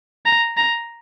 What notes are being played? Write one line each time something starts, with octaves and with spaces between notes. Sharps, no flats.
A#5
A#5